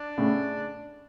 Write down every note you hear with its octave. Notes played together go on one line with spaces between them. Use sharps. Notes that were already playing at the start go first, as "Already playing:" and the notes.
Already playing: D4
A2 C#3